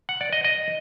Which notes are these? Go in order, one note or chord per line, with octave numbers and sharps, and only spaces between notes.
F#5
D5
D#5
D#5